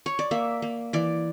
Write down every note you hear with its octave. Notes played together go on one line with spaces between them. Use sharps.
C#5
D5
A#3 E5
A#3
E3 D5